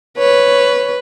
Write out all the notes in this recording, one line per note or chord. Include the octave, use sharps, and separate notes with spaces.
B4 C#5